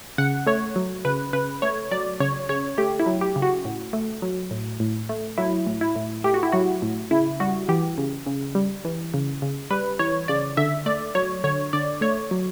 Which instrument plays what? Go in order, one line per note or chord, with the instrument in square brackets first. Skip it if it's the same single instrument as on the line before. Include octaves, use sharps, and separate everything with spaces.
[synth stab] C#3 F#5
A3 C#5
F#3
C#3 B4
C#3 B4
A3 C#5
F#3 D5
C#3 C#5
C#3 C#5
A3 G4
E4
F#3
G4
C#3
F#4
A2
A3
F#3
A2
A2
A3
F#3 E4
A2
E4
A2
A3 G4
F#4
E4
F#3 F#4
A2
C#3 E4
G3 F#4
E3 G4
C#3
C#3
G3
E3
C#3
C#3
G3 B4
E3 C#5
C#3 D5
D3 E5
A3 D5
F#3 C#5
D3 C#5
D3 D5
A3 C#5
F#3